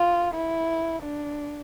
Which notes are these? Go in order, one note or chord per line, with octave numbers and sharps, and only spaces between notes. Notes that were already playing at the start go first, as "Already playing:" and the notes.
Already playing: F4
E4
D4